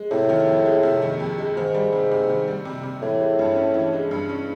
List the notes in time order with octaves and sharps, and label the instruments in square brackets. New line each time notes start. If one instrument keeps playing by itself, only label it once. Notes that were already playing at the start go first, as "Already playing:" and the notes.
Already playing: [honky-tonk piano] G#3
[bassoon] A2 [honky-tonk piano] C3
[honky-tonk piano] D#3
F2
G#3
C3
D#3
F2
G#3
[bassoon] G#2 [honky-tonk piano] D#3
[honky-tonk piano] G3
C3
C3
D#3
G3
C3
C3
[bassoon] A2 [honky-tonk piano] E3
[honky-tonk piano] G#3
G2
C#4
E3
G#3
G2
C#4